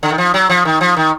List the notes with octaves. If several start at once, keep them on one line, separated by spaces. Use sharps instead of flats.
D3
D#3
F3
F#3
F3
D#3
F3
D#3